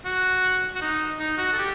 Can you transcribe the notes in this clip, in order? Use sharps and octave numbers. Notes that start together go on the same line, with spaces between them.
F#4
F#4
D#4
D#4
F#4
A4
G4